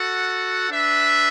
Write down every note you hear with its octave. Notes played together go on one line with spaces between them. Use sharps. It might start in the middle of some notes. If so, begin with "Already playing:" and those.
Already playing: F#4 A4 F#5
D4 B4 E5